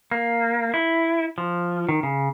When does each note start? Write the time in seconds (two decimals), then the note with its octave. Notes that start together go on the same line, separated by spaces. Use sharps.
0.11 A#3
0.74 E4
1.38 F3
1.89 D#3
2.03 C#3